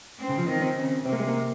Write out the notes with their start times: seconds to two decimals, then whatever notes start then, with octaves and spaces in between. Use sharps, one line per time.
0.19 C4
0.29 C#3
0.38 F3
0.48 D#3 C4
0.62 C4
0.76 C#3
1.05 C3 C4
1.13 A#3
1.20 G#3
1.28 A#3